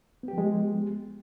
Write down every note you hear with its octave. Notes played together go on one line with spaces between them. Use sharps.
F3 G#3 B3 G4